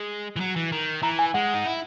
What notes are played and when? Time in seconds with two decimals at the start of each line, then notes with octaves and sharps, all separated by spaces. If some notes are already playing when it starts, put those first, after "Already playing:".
Already playing: G#3
0.36 E3
0.40 F#3
0.56 E3
0.72 D#3
1.02 E3 A#5
1.19 G#5
1.34 G#3 F#5
1.54 D#4
1.66 E4